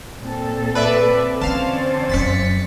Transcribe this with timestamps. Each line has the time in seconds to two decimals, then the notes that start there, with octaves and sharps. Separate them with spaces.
0.23 A#2 C4 A4
0.75 B4 D5 E5
1.41 D3 E3 C#4 C5 D5 F5 A5
2.09 F1 F#2 A6 B6 C#7